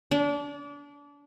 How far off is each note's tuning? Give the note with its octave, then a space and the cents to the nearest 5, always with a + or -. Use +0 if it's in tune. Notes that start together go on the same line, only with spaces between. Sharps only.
D4 -30